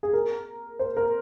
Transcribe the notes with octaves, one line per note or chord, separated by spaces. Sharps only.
G#4
A#4
C5
A#4